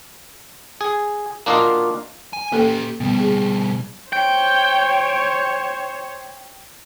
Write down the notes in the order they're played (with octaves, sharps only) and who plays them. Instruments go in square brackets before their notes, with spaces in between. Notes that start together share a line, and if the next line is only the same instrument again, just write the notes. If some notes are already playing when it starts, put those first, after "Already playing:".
[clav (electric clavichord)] G#4
A#3 D4 F4 F#4 D#5 F5
[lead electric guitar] G#5
[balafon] A#3 A4 G5 [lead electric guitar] C#4 G4
[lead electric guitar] B2 G3 [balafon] B3
[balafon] G#4
[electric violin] C5 C#5 [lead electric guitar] G5